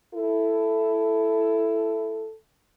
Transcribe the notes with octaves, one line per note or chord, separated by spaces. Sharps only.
E4 A4